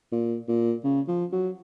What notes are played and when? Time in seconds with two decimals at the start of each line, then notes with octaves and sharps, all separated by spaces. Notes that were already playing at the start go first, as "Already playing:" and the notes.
0.12 A#2
0.48 A#2
0.84 C#3
1.08 F3
1.32 F#3